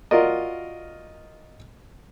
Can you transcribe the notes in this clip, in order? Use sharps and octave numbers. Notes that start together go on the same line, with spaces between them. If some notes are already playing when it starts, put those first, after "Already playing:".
F4 F#4 A#4 D5 D#5